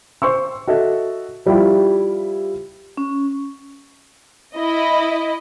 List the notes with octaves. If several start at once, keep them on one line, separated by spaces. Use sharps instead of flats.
C5 C6 C#6 E6
F#4 A4 D#5 E5
F3 G3 E4 F4 G4
C#4
E4 D#5